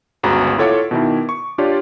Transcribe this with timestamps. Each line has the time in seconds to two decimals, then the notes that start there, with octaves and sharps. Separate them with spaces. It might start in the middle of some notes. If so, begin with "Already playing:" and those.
0.23 G1 C#2 C#3 F#4 A#5 B5
0.58 E4 F4 A4 C#5 F#5 D6
0.91 B2 D#3 E4
1.29 C#6
1.58 D4 F4 G4 C#5 D5